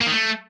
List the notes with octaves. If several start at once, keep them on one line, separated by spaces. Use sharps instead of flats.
A#3
D#3
A3